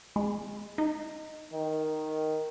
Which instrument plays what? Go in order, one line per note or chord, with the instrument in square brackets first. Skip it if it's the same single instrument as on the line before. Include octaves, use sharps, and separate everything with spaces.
[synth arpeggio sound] G#3
D#4
[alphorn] D#3